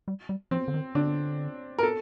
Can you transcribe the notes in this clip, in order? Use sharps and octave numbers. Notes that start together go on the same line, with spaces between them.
G3
G3
F3 C4
D3
D#3
D3 D4
A#4
A4